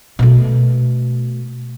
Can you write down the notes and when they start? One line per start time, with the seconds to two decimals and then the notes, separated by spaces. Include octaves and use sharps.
0.19 B2 A3